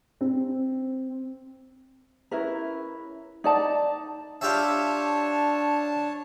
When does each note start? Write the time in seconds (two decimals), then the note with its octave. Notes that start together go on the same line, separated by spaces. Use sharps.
0.21 C4
2.31 C#4 E4 A#4 B4
3.44 D#4 D5 A5
4.41 D4 F4 G4 C#5 E5 A5